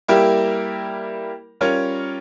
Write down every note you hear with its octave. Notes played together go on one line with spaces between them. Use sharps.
G3 A#3 E4 G4 A#4
G3 C#4 F4 A#4 C#5